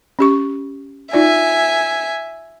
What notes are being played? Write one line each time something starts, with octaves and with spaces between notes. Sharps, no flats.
C#4 G4 C#6
D#4 F4 D5 E5 G#5